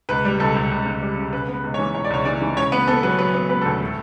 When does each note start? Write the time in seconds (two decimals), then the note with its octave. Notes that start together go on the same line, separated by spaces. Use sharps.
0.09 C#2 B4
0.25 G3
0.40 C#2 A4
0.56 C#2
0.71 C#2
0.86 C#2
1.02 G3
1.18 C#3
1.33 C#3 B4
1.48 B3
1.53 B4
1.64 C#2
1.74 C#5
1.79 E3
1.95 C#2 C#5
2.05 D5
2.10 C#2 C#5
2.25 E3 D5
2.41 E3
2.57 C#3 C#5
2.72 B3 B4
2.87 B3 A4
3.03 F#3 B4
3.19 F#3 B4
3.34 B3
3.49 B3 B4
3.61 D2 A4
3.80 A2
3.86 A4